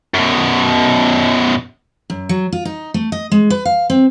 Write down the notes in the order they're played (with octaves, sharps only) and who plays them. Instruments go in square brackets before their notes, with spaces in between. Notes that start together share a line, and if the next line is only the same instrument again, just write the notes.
[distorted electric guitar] F#2 B2
[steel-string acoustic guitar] F#2
F#3
F4
D#4
A3
D#5
G#3
B4
F5
C4